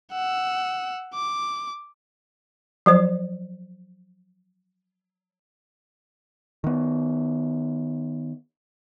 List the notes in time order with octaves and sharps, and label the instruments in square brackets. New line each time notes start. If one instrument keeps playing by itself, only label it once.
[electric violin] F#5 E6
D6
[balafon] F3 F#3 C5
[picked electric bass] D#3 B3